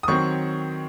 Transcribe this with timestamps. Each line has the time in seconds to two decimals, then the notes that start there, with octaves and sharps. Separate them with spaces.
0.03 D#6
0.08 D#3 F#3 C4 C#5 C#6